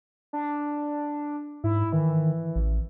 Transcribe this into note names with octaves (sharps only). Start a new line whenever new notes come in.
D4
G#2 E4
D#3 E3
A1